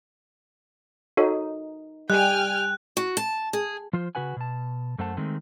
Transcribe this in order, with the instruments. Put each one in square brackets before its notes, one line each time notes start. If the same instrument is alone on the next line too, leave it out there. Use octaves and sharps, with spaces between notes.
[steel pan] D#4 [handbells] F#4 A4 C#5
[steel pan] G3 [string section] G5 G#5 F6 [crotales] F#6
[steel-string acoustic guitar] F#4
A5
G#4
[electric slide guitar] F3 F4 C5
C#3 F#4 B4 F#5 G#5
B2 A5
F#2 A3 C5 F#5 A5
D#3 G#3 A3 C4